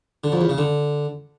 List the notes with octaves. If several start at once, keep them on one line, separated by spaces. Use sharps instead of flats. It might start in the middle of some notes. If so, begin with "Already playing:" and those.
D3
F2
E2
C#3
D3